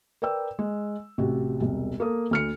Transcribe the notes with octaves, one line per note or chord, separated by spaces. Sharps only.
A#4 B4 D5 G5 E6
G#3
A1 C3 F#4
E1 C2
A#3 A4 D#6
D2 F6 C#7